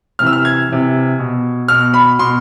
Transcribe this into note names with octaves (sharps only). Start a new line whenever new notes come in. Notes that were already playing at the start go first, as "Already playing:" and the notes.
C3 E3 F6
E6
F6
G#6
C3 E3
B2
B2 F6
B5
B2 C6